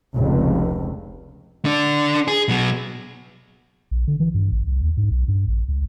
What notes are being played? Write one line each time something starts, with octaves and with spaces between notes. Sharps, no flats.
F1 C#2
D3 D4
G#4
B2 F#3
A#1
D3
E3
G2
A1
C2
D#2
G#2
B1
G2
A1
C#2